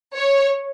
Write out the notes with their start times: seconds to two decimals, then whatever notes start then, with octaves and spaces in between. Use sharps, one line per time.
0.14 C#5